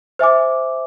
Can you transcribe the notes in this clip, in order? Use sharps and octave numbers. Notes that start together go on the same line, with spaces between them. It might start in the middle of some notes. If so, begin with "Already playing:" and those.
C5 E5 G#5 D6